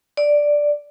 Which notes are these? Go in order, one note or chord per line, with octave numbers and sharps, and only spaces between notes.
D5